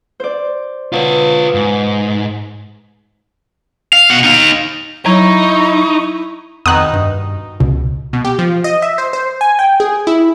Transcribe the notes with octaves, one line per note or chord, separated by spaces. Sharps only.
C5 D5
B2 F4 C#5
G#2
F5
B2 F#5
D#4 F5
F#3 D#4 E4 C#6
F2 B2 D#3 D#4 D#6 F#6
G2
C#2 B2
B2
G4
F3
D#5
E5
C5
C5
G#5
G5
G#4
E4